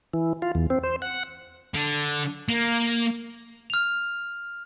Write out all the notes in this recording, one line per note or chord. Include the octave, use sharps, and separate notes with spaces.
E3
F4
E2
C4
C5
F#5
D3
A#3
F6 F7